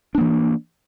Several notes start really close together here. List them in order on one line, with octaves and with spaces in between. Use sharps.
D4 A#3 E3